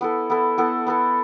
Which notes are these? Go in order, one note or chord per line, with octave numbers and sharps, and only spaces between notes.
B3 E4 A4
B3 E4 A4
B3 E4 A4
B3 E4 A4